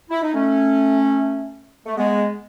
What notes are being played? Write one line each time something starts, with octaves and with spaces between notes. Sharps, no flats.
E4
D#4
A3 C#4
A3
G#3 B3